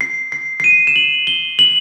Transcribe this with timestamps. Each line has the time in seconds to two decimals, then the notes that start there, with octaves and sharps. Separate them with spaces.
0.01 C7
0.32 C7
0.60 C7
0.64 D#7
0.87 E7
0.96 F#7
1.27 G7
1.59 F#7